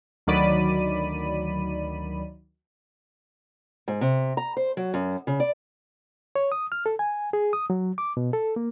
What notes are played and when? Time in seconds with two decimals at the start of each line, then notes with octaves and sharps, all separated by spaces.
0.27 D2 D#3 F#3 D5 B5 D#7
3.88 G#2
4.01 C3
4.37 A#5
4.57 C5
4.77 F#3
4.94 F#2
5.27 C#3
5.40 D5
6.36 C#5
6.52 D#6
6.72 F6
6.86 A4
6.99 G#5
7.33 G#4
7.53 D#6
7.70 F#3
7.98 D6
8.17 B2
8.33 A4
8.56 A#3